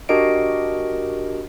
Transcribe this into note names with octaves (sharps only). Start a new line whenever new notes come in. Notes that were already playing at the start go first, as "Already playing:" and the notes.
D4 F#4 G4 A#4 D#5 D7